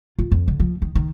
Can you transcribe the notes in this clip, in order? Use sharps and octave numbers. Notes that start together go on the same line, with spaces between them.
F4
F2
D3
F3
D#3
D#3